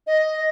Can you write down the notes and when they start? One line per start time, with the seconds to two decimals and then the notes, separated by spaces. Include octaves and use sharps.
0.07 D#5